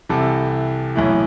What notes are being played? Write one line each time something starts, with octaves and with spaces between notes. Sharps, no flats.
C2 C3 E3 A4
B1 A2 E3